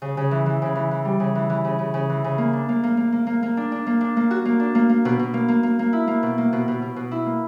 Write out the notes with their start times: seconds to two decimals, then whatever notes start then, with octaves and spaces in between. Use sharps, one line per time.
0.02 C#3
0.17 C#3
0.31 E3
0.46 E3
0.62 C#3
0.75 E3
0.91 E3
1.05 G3
1.20 C#3
1.35 E3
1.50 E3
1.65 C#3
1.79 C#3
1.94 C#3
2.10 E3
2.24 C#3
2.38 A#3
2.53 D4
2.69 A#3
2.84 A#3
2.97 A#3
3.12 A#3
3.27 A#3
3.43 A#3
3.57 D4
3.72 D4
3.87 A#3
4.01 D4
4.17 A#3
4.31 F#4
4.45 A#3
4.60 D4
4.75 A#3
4.89 A#3
5.05 B2
5.19 B2
5.34 A#3
5.48 A#3
5.63 A#3
5.79 A#3
5.93 E4
6.08 A#3
6.23 B2
6.38 A#3
6.53 B2
6.68 B2
6.82 B2
6.96 B2
7.11 E4
7.26 A#3